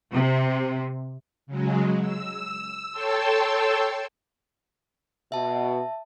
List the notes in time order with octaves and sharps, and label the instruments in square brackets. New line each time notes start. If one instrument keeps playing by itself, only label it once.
[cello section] C3
[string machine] C#3 F#3 G#3
E6
A4 C#5 G5 A5 C6 E6
[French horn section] B2 [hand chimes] E5 A5